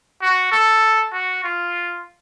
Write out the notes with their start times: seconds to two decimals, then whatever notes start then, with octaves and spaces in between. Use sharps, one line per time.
0.22 F#4
0.51 A4
1.13 F#4
1.44 F4